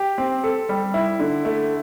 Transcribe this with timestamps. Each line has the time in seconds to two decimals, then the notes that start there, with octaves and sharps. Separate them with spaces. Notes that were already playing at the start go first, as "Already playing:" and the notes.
Already playing: G4
0.18 C4
0.44 A4
0.69 G3
0.94 E4
1.20 D3
1.45 A3